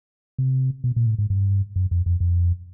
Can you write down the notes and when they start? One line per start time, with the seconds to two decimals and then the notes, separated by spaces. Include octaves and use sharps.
0.39 C3
0.84 B2
0.96 A#2
1.07 A2
1.19 G#2
1.30 G2
1.76 F#2
1.91 F2
2.06 F2
2.20 F2